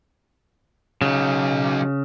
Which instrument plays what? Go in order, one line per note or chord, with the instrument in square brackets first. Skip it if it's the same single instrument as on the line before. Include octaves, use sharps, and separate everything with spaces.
[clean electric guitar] C#3 [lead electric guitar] F#3 D#4